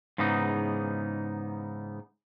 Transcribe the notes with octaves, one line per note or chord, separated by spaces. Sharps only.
G#2 C#3 E3 B3 D#4